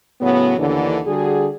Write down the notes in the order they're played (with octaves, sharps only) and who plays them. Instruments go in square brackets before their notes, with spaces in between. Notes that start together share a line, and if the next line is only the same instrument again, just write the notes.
[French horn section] A2 C#3 F#3 B3
D#2 D3 E3
D3 G3 F#4 G#4